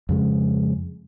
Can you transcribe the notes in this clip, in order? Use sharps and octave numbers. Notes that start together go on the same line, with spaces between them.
F2 C#3 G#3